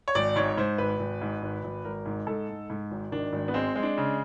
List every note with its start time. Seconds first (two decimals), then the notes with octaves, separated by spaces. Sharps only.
0.08 C#5
0.15 G#1 D5
0.36 G#2 C#5
0.58 G#2 C5
0.78 G#1 B4
0.99 G#1
1.21 G#2
1.42 G#1
1.64 G#1
1.85 G#1 A#4
2.06 G#2
2.27 G#2 A4
2.49 G#2
2.70 G#2
2.91 G#1
3.12 D#3 D4
3.33 G#1
3.48 B3
3.54 G#3 C4
3.76 G#3
3.83 D4
3.97 C#3